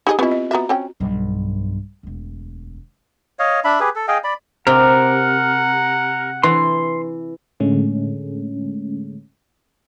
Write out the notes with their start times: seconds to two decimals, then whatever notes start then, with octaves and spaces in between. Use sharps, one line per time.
0.07 D#4 G4 G#4 D#5
0.19 B3 C4 E4 F4 D#5
0.31 D#5
0.51 B3 F#4 E5 A#5
0.69 C4 C#4 G5
1.00 B1 G2
2.03 E1 D2
3.39 C#5 D#5 F5
3.64 D4 E5 B5
3.80 G4 G#4 B4
3.96 A4
4.08 G#4 D#5 F5 G5
4.24 D5 B5
4.67 C3 A#4 F#5
6.43 E3 C6
7.60 A2 D3 G#3 A3 C#4